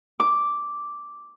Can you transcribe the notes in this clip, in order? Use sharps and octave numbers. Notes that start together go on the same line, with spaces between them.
D6